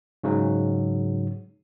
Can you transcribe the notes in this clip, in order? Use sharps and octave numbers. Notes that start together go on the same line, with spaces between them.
G#2 C#3 F#3